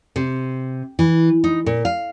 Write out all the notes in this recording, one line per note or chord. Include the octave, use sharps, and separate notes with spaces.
C3
E3
D#4
A#2
F5